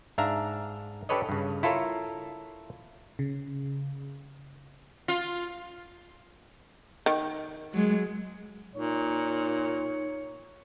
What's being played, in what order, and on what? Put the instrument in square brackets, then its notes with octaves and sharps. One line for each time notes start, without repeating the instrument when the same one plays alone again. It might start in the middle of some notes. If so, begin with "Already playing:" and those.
[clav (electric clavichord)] G#2 D4 E5 F5 A#5
D4 G4 A4 B4 C#5 D#5
G2 C#3
E4 F4 A4 A#4 C#5
[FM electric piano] C#3
[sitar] F4
[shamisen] D#3
[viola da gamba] F#3 G#3
[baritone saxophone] A#2 [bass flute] D#4 [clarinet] C#5